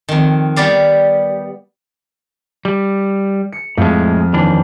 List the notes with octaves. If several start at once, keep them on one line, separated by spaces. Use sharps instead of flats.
F2 D#3
G3 B3 D5 F5
G3
C#7
F2 A2 G#3
D#2 E3 D4